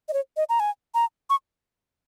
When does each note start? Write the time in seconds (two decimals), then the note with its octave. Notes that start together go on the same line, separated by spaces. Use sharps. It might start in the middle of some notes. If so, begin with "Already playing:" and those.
0.09 D#5
0.13 C#5
0.37 D#5
0.49 A#5
0.60 G#5
0.94 A#5
1.30 C#6